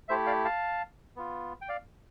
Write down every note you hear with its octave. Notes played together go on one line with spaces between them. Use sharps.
A3 E4 G4 C5 E5
D5 F5
F5 A5
B3 F4
G5
D5 F5